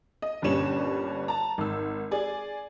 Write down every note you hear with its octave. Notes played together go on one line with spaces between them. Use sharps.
D#5
G1 G2 A#2 G3 C#4 E7
A5 A#5
G#1 E6
G#4 D5 G#5